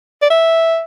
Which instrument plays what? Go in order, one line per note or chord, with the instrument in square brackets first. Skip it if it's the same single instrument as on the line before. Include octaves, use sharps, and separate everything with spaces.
[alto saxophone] D5
E5